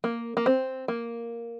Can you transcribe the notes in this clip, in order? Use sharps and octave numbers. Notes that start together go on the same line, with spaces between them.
A#3
A#3
C4
A#3